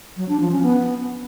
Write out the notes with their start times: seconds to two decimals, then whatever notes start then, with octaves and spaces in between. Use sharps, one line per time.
0.17 F#3
0.29 D4
0.40 F3
0.51 C#4
0.63 B3